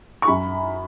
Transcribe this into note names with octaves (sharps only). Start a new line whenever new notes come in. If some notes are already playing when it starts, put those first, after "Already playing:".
C#6
F#2 B5